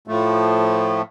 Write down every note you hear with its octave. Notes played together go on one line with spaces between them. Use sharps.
A2 F3 A3